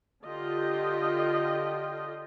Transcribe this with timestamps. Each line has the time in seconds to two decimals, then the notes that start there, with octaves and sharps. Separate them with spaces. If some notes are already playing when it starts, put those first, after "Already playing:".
0.24 D3 F4 G4 D#5 G5